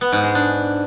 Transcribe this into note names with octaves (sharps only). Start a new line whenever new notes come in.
B3
G#2
G#3
D4